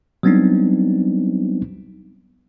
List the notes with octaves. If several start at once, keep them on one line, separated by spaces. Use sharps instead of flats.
F#3 G3 B3 C4 D4 D#4